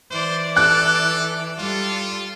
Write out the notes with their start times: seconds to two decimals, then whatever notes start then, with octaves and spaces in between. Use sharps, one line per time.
0.11 E3 C5 D5
0.56 A4 F#6
1.59 G3 F4 A4